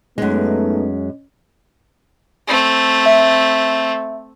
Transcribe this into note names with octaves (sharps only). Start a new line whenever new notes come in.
F#2 G#3 A3 B3 C#4 D#4
A3 C4
E5